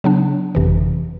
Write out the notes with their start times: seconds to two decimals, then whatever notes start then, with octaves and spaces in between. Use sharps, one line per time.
0.04 C#3 F#3 B3 D4
0.55 G1 F2 C3 E3